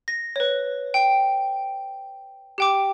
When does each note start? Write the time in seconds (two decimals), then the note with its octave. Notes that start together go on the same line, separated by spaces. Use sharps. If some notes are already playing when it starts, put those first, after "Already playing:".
0.08 A#6
0.36 B4 C#5
0.94 G5
2.58 G4 G5 D6